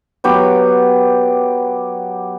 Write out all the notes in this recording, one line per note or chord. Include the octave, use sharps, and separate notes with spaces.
F#3 B3 G4 F#5